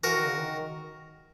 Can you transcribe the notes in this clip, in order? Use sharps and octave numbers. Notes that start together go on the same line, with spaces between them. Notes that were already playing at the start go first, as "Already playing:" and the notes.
E3 F#4 A#4
D#3
C#3
D#3